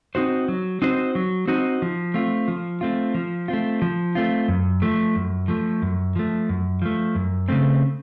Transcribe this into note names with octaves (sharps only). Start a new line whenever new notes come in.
C4 D#4 F#4 C5
F#3
C4 D#4 F#4 C5
F#3
C4 D#4 F#4 C5
F3
A3 C4 F4
F3
A3 C4 F4
F3
A3 C4 F4
F3
A3 C4 F4
F#2
F3 A3
F#2
F3 A3
F#2
F3 A3
F#2
F3 A3
F#2
C#3 A3 C4